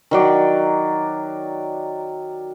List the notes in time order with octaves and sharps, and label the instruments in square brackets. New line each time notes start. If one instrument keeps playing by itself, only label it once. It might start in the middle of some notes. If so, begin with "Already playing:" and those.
[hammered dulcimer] D#3 F#3 D5